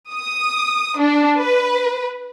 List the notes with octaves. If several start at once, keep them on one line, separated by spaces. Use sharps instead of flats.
D#6
D4
B4